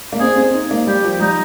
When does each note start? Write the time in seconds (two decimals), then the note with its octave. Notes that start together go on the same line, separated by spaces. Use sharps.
0.12 A#3
0.20 C4 G#4
0.36 C4
0.54 D#4
0.71 A#3
0.87 G3 G4
1.04 F3
1.20 G3 D#4